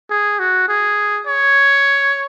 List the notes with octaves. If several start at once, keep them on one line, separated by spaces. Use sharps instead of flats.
G#4
F#4
G#4
C#5